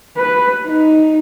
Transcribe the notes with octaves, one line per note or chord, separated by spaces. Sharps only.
B4
D#4